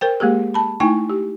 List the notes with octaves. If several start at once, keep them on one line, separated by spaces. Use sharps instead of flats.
A#4 C5 G5
G#3 A#3 G4 G#4
A5 B5
A3 D#4 E4 G5 G#5 C#6
G4